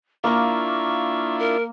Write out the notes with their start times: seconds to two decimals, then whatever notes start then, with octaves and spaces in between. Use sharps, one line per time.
0.24 A#3 D4 E4 F4 A#5 C#6
1.39 A#4